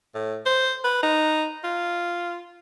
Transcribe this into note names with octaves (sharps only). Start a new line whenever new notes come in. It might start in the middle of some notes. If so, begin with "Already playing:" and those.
A2
C5
B4
D#4
F4